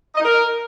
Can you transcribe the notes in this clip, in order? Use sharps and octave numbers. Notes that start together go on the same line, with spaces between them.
D#5
D#4
A#4